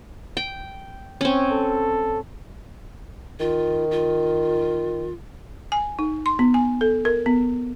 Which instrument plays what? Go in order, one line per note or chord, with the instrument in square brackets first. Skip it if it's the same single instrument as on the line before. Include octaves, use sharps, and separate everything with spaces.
[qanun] G5
C4 C#4
[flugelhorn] A4
[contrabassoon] D#3 [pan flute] F4
[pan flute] F4
[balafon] G#5
D#4
C6
B3
G#5
A4
A#4
B3